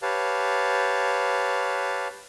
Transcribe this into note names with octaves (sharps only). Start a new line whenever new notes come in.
G4 B4 C#5 F5 A5